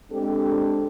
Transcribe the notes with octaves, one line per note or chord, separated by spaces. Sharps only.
G#3 C4 D4 G4 A4